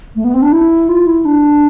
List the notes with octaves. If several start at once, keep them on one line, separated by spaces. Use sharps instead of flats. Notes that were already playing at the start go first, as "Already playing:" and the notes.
A3
B3
C4
D4
E4
F4
E4
D4